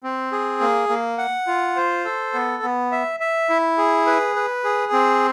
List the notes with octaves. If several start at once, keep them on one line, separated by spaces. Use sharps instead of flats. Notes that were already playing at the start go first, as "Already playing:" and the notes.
C4
G#4
A#3
A#3
F#5
F4
C5
A4
B3
B3
E5
E5
E4
G#4
B4
B4
G#4
C4